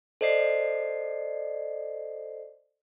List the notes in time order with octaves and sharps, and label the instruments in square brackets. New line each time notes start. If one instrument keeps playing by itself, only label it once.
[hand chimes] A4 C5 D5 D#5 C7